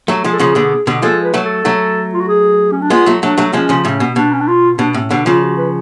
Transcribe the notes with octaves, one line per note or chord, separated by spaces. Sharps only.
F#3 A3
F3 G#3
A4
C#3 F3 G#4
B2 D3
B2 D3
F3 G#3 A4
B4
F#3 A3
A4
F#3 A3
F4
F#4
G#4
C#4
D4
G#3 B3 F4
F#3 A3
F#3 A3 D4
F#3 A3
F3 G#3 C#4
C#3 F3
A2 C#3 C#4
B2
B2 D4
C#4
D4
F4
B2 D4
A2 C#4
B2 D3 D4
C#3 F3 F4
F#4
B4